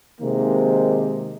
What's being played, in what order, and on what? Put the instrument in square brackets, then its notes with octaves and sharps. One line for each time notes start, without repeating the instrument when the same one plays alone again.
[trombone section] C3 D#3 G#3 A#3